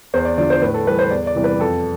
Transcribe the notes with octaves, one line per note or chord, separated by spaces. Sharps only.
E2 C5
D5
D3 F3 D5
C5
A2 B4
A4
E3 G3 B4
C5
E2 D5
D5
C3 E3 G3
B4
F2 A4